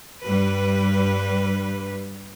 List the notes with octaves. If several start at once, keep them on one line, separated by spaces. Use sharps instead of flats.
G2 G3 B4